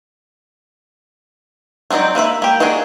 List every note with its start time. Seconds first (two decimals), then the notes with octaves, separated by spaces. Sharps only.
1.90 F#3 G#3 C4 D#4 D5
2.15 A#3 B4 E5 B5
2.42 A#3 G4
2.60 A#3 D4 D#4 F#4 G#4